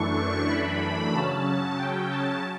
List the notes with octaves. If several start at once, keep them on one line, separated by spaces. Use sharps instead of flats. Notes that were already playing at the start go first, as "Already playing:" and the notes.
Already playing: F#2 E3 A3 D4 C#6
B5
C#3 F#3 C#4 A5
G5
A5